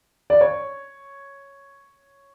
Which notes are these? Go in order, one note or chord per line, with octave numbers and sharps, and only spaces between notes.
D5
C#5